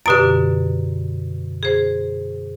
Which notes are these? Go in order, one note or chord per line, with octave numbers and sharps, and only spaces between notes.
F#2 B2 D3 G4 B4 D7
G#4 C5